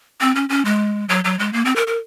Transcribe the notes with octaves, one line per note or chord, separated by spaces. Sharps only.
C4
C#4
C#4
G#3
F#3
F#3
G#3
A#3
C4
A#4
A#4